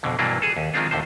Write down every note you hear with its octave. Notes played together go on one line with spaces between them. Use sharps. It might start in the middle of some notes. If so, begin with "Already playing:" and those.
F2 B2 D3
G2 B2 E3 F#3 A#3 D4
G#4 A4
D#2
D#3 F3 G#3 C4 D4 F4
D#2 A2 D3 C5